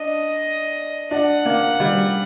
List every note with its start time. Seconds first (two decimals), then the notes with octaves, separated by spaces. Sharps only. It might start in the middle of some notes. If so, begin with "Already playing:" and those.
Already playing: D4 D#5
1.11 D4 F#5
1.46 A#3
1.80 G3